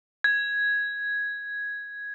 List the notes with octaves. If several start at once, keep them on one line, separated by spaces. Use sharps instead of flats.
G#6